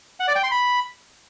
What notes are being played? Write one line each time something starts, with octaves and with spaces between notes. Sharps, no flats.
F#5
D5
G5
C6
B5